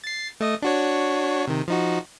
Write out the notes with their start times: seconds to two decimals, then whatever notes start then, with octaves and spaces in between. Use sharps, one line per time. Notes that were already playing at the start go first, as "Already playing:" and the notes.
0.04 A6 C7
0.40 A3 D#5 D#6
0.62 D4 F#4 C#5
1.48 C3 D#3
1.68 F3 D#4 F#4